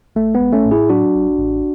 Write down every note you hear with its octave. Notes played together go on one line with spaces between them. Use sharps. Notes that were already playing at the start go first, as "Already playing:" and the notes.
A1 A3
G#3 B3
A1
A3 C#4
A2
E4 G#4
F#3 D4 F#4
A1
A1